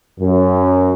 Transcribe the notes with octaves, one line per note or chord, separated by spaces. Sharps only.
F#2